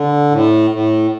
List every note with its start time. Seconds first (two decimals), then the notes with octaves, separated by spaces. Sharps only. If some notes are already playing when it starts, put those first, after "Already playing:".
Already playing: D3
0.31 A2
0.70 A2